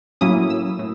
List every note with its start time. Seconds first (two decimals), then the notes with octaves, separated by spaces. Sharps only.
0.21 A2 F#3 A#3 C#4 E4 D#6
0.50 E6
0.79 A2